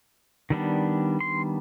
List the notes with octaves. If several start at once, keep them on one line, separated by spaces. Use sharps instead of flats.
D#3 G3 B3 D4
C6